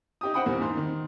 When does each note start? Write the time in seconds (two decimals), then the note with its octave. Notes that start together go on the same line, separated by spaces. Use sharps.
0.21 D#4 G4 D#6
0.34 D#4 C5 F#5 G5 B5 D#6
0.45 E2 G3 A#3 C4
0.61 G#2 C6
0.77 D#3